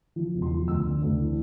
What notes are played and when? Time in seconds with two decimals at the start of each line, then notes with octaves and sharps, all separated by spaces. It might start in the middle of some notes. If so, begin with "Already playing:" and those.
0.16 F3
0.34 E1
0.42 C6
0.51 F3
0.68 D2 E6
0.86 D3
1.02 D2
1.20 E3